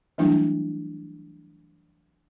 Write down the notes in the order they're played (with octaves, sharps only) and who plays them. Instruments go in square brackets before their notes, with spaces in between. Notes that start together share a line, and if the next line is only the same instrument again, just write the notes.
[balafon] E3 F#3 G3 A3 D4 E4